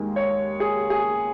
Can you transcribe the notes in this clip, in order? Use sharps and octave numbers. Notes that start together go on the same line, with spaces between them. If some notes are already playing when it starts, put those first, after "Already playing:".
Already playing: D#2 D#3 G#3
C#5
G#4
G#4